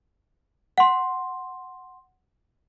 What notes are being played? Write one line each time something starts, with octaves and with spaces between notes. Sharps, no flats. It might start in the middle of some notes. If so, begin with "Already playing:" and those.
F#5 C6